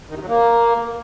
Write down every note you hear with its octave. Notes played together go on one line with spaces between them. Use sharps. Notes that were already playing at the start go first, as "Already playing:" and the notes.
D#3
C3
F#3
A#3